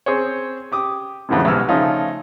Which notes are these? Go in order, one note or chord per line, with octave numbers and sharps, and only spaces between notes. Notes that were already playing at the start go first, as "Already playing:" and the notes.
C4 G#4 C5 C#5
G4 D6 D#6
F2 A2 D3 E3 G3 G#3
B1 G#2 G3 E6 F6
C#3 F3 A3 C#4 D#4 F4